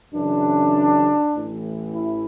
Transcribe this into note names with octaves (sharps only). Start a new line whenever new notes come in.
F#2 C#3 E3 D4
A1 A2 E3
E4